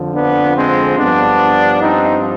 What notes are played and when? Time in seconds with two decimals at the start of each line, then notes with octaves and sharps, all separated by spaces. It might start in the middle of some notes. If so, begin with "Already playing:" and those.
Already playing: F2 D3 F3
0.14 B3 D4
0.56 G#3 C4
0.98 G2 F3 B3 D4
1.82 C4 D#4